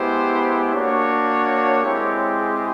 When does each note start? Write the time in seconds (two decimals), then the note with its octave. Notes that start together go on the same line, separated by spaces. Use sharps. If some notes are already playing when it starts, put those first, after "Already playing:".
Already playing: G#3 B3 E4 G4 C5
0.74 A#3 D4 F#4 C#5
1.83 G#3 C4 E4 G4
2.37 G#4